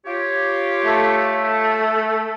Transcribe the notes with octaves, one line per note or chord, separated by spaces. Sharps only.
F4 G4 C#5
A3